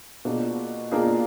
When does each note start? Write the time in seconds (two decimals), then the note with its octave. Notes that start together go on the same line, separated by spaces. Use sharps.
0.25 B2 A#3 D4 F4 G#4
0.91 B2 A#3 D4 F4 G#4